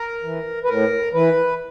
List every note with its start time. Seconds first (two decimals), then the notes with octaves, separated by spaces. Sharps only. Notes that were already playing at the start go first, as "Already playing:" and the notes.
Already playing: A#4
0.23 E3
0.64 B4
0.68 A2 A#4
1.13 E3 B4